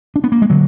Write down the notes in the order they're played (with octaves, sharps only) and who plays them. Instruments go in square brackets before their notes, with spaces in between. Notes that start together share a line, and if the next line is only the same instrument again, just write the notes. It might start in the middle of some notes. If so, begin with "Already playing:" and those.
[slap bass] D4
B3
A#3
G#3
D3 F#3